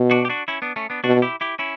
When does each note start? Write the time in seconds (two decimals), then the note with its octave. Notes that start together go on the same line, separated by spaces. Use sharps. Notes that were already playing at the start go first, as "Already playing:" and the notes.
Already playing: B2
0.11 D4 F#4
0.25 G4
0.29 D4 F#4
0.48 C#4 E4
0.62 B3 D4
0.76 A3 C#4
0.90 B3 D4
1.04 B2 D4 F#4
1.22 E4 G4
1.41 E4 G4
1.59 C#4 E4